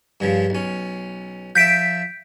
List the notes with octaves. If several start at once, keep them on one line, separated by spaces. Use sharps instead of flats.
G2 C#3 F3
B1 C#4
F3 E5 G6 B6 D7